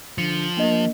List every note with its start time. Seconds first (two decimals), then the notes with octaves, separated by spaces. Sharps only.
0.18 D3 F3 C#7
0.57 A#3 D4 D#5